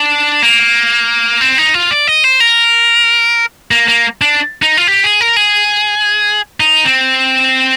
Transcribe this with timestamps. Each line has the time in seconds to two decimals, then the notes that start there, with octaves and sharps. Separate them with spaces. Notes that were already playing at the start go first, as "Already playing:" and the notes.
Already playing: D4
0.42 A#3
1.41 C4
1.58 D#4
1.74 F4
1.91 D5
2.07 D#5
2.24 C5
2.40 A#4
3.71 A#3
3.88 A#3
4.22 D4
4.62 D#4
4.77 F4
4.87 G4
5.04 G#4
5.21 A#4
5.37 G#4
6.60 D#4
6.85 C4